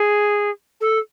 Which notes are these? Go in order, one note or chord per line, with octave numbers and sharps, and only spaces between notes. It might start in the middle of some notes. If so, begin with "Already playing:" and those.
Already playing: G#4
A4